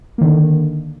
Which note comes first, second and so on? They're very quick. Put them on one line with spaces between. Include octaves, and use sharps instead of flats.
A#3 D#3 D3